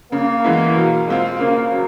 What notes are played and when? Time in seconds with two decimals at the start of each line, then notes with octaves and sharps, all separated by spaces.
0.12 C#3 A#3
0.44 E3 G#3 B3 E4
0.76 B2
1.08 G#3 C4 F4
1.39 C#3 A#3
1.72 F#3